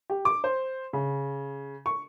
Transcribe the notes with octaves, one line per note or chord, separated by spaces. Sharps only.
G4
D6
C5
C#3
C#6